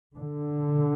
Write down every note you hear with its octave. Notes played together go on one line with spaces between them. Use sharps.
D3